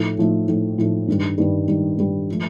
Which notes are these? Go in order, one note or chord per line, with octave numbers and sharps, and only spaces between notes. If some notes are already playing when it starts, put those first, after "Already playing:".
Already playing: A2 F3 A3 D#4
A2 F3 A3 D#4
A2 F3 A3 D#4
A2 F3 A3 D#4
G2 D#3 G3
G2 D#3 G3
G2 D#3 G3
G2 D#3 G3
F3 A3